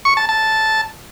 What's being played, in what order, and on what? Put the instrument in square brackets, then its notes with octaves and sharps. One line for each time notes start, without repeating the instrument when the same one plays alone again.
[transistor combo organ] C#6
A5
A5